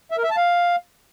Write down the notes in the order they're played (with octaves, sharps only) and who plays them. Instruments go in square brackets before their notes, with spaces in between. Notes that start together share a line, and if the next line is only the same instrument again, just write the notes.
[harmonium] E5
A#4
E5
A5
F5